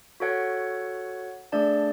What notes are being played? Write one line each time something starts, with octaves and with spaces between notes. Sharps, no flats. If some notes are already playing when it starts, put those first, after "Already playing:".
F#4 A4 C#5 F#5
A3 D4 G#4 D5 A5